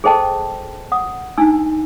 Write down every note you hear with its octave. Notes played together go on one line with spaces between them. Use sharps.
G#4 A4 C5 D#5 G5 A5
F#5 D#6
D4 D#4 G#5 E6